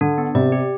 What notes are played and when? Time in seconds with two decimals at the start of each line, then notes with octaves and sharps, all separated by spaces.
0.01 D3 D4
0.18 B3
0.35 C3 D5
0.52 G4